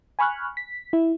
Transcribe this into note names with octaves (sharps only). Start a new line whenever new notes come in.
G#5 B5 C#6 F6 F#6
B6
E4